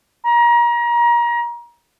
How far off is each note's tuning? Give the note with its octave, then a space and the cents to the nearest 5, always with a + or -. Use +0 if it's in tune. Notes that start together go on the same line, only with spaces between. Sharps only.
A#5 +30